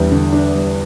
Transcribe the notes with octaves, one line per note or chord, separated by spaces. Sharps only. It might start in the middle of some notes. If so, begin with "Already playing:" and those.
Already playing: E2 G3 D4
D3
D4
G3